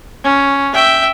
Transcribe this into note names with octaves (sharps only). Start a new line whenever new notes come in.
C#4
E5 G5